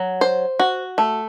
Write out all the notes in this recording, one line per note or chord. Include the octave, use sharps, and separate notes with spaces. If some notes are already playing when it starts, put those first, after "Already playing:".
Already playing: F#3
C5
F#4
A3